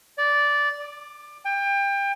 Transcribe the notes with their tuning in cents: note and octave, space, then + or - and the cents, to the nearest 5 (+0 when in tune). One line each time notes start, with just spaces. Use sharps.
D5 -10
D6 +20
G5 +25